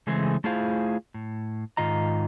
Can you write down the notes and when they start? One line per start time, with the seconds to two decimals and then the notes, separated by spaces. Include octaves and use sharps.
0.07 C#3 E3 G#3 A3 C4 G#4
0.44 A3 E4 F4 G#4 C5 F5
1.14 A2
1.77 G#2 D#3 F4 D#5 A#5